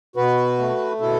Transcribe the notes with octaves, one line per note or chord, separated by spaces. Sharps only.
B2 F#4 B4
A3
B2 E4 A4